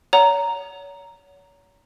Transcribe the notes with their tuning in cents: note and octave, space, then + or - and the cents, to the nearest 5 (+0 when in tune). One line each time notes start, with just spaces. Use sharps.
C#5 +35 F#5 +0 A#5 +0